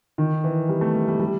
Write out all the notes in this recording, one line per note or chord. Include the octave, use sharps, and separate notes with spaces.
D#3
E3
G3
A3
G3
G3
G3